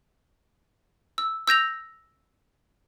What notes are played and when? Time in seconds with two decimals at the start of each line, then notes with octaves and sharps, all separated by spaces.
1.18 E6
1.47 E6 G6 A#6 F7